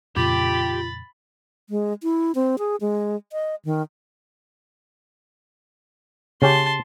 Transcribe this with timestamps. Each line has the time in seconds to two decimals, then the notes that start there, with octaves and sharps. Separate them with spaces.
0.16 F2 A#2 C#3 F4 G4 B5 A6
1.70 G#3
2.03 E4
2.35 C4
2.59 G#4
2.81 G#3
3.32 D#5
3.65 D#3
6.42 C#3 C#4 G4 A5 C6